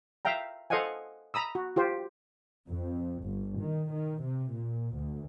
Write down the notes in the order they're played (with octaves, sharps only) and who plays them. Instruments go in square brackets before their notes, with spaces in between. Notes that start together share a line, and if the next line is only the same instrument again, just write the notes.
[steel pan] E5 F5 G5 A#5
A4 C5 D#5 F5 F#5 G#5
A#5 B5 D#6 E6
F#4
F4 G4 C5
[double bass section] F2
G1
D#3
D#3
C3
A#2
D2